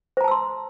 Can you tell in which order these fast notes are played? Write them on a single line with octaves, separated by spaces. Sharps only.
C5 A#5 A5 E6 C6